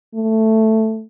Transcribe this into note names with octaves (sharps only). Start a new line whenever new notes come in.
A3